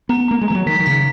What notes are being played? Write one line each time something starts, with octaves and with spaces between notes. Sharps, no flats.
B3 A#5
A#3 A#5
G#3
E3 A#5
F#3
D#3 B6
D#3
C#3 B6